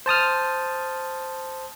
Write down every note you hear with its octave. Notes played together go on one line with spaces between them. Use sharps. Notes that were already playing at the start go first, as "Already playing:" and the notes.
C5 A5 D#6 F6